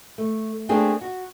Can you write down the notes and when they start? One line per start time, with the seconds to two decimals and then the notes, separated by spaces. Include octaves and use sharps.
0.18 A3
0.69 A3 A#3 C4 D4 G#4
1.01 F#4